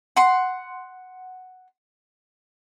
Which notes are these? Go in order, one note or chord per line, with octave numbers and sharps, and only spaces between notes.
F#5 C6